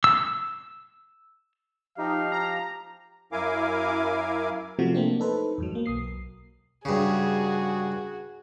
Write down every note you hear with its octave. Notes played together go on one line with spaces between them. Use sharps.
E6
F3 D#4 G4 F5
A#5
F#2 E4 A#4 F5 G#5 D6
C3 F3 F#3 A3 F4 F#4
A3 A#3 C4 D4
D#4 A4 B4 C5
E2 G#2 F#3
F#3 A#3
B1 D#6 C7
G2 C#3 F#4 G#4